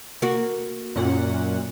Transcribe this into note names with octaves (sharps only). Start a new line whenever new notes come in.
A#3 F#4
F#2 A#2 F#5